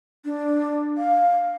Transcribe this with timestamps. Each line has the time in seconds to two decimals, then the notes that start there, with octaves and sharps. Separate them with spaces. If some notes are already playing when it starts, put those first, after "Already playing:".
0.25 D4
0.97 F5